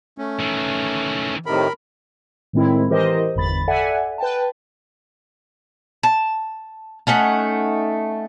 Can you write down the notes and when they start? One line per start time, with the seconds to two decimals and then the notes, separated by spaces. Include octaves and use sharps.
0.18 A3 C#4
0.40 D#3 E3
1.46 A2 C3 D#3 A#4 B5
2.53 A2 D#3 G#3 C4 E4
2.90 E3 G4 A#4 C5 D#5
3.35 G1 E2 B5 A6
3.68 A4 D5 E5 F#5 G#5
4.18 B4 G5 A5
6.03 A5
7.07 A3 C#4 D#4 F#5